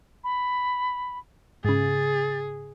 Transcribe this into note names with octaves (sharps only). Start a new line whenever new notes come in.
B5
G#2 C#3 G#4 A6